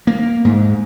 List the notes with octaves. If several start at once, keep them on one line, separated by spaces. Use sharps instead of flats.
A#3
G#2